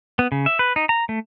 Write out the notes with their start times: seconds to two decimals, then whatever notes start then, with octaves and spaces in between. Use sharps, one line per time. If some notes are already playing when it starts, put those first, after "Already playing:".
0.19 B3
0.32 C#3
0.46 E5
0.59 B4
0.76 D#4
0.89 A#5
1.09 A3